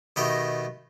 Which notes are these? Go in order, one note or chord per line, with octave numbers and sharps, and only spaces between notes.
B2 D#3 A3 G4 D#5 A#5